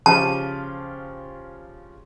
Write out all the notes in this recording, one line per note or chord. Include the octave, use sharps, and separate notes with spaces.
C#3 F3 G4 A5